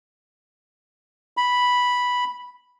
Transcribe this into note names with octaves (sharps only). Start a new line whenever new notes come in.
B5